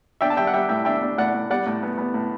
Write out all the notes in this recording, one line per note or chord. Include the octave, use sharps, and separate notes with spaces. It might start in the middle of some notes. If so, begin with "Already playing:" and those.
D4 E5 G5
A5
G3 E5 G5
F#5
G3 E5 G5
A2 E5 G5
D4 E5 G5
D4
A2 D5 F#5
A2
G3 D5 F#5
A2
B3
B3
A2